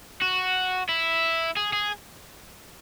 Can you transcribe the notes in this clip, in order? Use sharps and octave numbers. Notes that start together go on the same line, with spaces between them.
F#4
E4
G#4
G#4